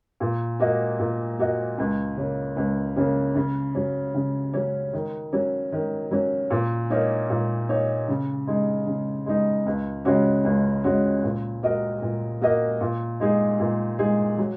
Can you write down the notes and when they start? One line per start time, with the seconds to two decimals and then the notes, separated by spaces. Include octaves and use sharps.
0.20 A#2
0.60 A#3 F#4 D#5
0.99 A#2
1.39 A#3 F#4 D#5
1.78 C#2
2.17 C#3 A#3 C#4
2.56 C#2
2.96 C#3 A#3 C#4
3.35 C#3
3.75 F#3 C#4
4.14 C#3
4.54 F#3 C#4
4.93 D#3
5.33 F#3 C#4
5.72 D#3
6.11 F#3 C#4
6.50 A#2
6.90 A#3 D#4 A#4 C#5
7.30 A#2
7.69 A#3 D#4 A#4 C#5
8.08 C#3
8.47 G#3 D#4
8.87 C#3
9.26 G#3 D#4
9.66 C#2
10.05 C#3 G#3 C#4 F#4
10.44 C#2
10.84 C#3 G#3 C#4 F#4
11.23 A#2
11.63 A#3 F#4 A#4 D#5
12.02 A#2
12.41 A#3 F#4 A#4 D#5
12.81 A#2
13.20 G#3 D#4 G#4
13.60 A#2
13.99 G#3 D#4 G#4
14.38 F#3